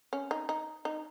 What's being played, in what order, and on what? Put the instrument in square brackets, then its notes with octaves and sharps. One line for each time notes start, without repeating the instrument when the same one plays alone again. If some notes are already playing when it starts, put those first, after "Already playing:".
[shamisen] C#4
D#4
D#4
D#4